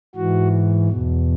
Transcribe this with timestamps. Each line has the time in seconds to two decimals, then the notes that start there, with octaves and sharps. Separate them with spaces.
0.15 G#2 E3 F#4
0.88 E2 B2